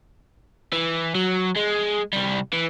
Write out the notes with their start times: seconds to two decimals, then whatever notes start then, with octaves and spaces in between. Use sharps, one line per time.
0.73 E3
1.15 F#3
1.57 G#3
2.13 C2 G3
2.53 E3